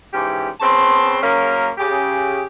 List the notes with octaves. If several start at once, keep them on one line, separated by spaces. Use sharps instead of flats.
G#2 E3 C#4 G4
C#3 B3 C4 A5 B5 C6
F#2 C#3 A#3 C#4 A#4
C#3 G4 G#4